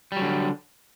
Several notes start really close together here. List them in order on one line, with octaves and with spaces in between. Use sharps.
G3 F#3 D3